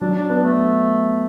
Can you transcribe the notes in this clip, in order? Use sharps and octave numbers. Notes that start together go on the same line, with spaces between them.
F#3 D4
D4
B3 D4
A3